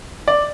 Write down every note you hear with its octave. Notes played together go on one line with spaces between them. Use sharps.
D5